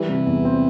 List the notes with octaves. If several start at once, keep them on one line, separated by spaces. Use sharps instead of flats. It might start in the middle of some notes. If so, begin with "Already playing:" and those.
Already playing: E3 G3
C3
E2
C4